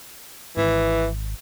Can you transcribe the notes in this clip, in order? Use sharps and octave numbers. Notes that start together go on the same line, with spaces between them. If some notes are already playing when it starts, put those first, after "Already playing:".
G#1 E3